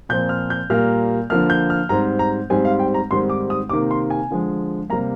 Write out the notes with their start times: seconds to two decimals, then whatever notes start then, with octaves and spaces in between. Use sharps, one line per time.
0.09 A#2 F3 C4 G6
0.29 F6
0.50 G6
0.70 A#2 G3 A#3 F6
1.30 D3 F3 A#3 F6
1.50 G6
1.70 F6
1.89 G#2 G3 C4 A#5
2.19 A#5
2.50 G#2 G3 C4 G#5
2.65 F5
2.79 G5
2.94 A#5
3.11 G#2 D#3 G3 C4 C6
3.29 D6
3.50 D#6
3.69 C3 D#3 A#3 D6
3.91 C6
4.10 G#5
4.31 D3 F3 G#3
4.90 C3 G3 A#3 A#5